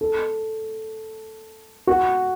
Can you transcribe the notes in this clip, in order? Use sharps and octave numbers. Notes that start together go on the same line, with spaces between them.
A4
F#4